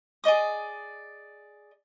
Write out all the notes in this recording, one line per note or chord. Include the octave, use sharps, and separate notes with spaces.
G#4 D5 D#5 D#6